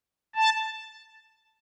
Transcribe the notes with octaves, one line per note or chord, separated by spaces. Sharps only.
A5